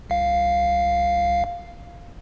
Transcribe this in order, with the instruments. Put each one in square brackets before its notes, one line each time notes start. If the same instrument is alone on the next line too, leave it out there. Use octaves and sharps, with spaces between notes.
[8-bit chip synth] C2 F5